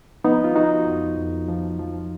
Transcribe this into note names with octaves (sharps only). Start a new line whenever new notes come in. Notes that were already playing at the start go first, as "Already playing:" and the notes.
F3 B3 D#4
F4
F3 D#4 F#4
F2
F2
F3
F3